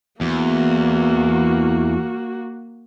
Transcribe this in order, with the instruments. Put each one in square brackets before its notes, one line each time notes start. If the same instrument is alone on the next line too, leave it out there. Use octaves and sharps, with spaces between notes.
[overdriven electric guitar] E2 [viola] A#3 F#4